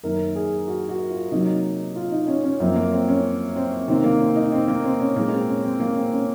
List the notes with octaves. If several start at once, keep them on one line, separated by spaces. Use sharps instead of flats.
F#2 D#3 A#3 A#4
G#4
F#4
F#4
F4
C3 F#3 A#3 D#4
F4
D#4
C#4
C#4
F#2 F3 A#3 C4
A#3
C4
C#4
C4
C3 D#3 A#3 C4
A#3
C4
D#4
C4
A#3
C4
C#4
A#2 G#3 A#3
C4
C#4
C4
A#3
C4
C#4